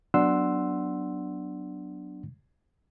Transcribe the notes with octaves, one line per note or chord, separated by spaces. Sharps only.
F#3 B3 D4 F#5 C6 E6